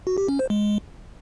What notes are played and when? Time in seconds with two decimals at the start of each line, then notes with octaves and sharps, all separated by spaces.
0.07 F#4
0.18 G4
0.28 C#4
0.39 C5
0.50 G#3